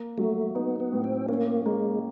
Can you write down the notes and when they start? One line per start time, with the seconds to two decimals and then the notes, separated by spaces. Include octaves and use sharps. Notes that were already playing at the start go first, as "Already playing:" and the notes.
Already playing: A#3
0.18 F#3 A3
0.55 B3 D#4
0.80 B3
0.92 A2
1.04 C4
1.29 A#3 C#4
1.66 G#3 A#3